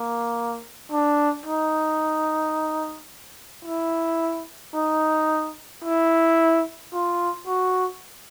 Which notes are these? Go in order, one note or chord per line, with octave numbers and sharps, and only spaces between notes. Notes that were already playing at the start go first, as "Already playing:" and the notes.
Already playing: A#3
D4
D#4
E4
D#4
E4
F4
F#4